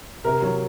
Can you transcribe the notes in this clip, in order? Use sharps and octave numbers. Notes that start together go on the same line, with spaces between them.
C3 A#4
F#3